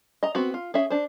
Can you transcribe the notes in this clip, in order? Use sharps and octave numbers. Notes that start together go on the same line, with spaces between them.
D#5 A#5
B3 C4 F#4
F4
C#4 G#4 E5
D4 C5